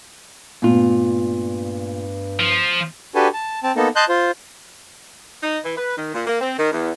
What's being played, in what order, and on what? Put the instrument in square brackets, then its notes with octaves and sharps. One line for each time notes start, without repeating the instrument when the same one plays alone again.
[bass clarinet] G2 [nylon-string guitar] A#2 F4 [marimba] A3 B3
[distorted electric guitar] F3
[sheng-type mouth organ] D4 F#4 G4 A4 B4 G#5
A5
C4 A5
A#3 B3 D#4 A4
D#5 A5 C6 F#6 G6
F4 C5
[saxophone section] D#4
E3
B4
D#3
A#2
A#3
C4
D#3
E2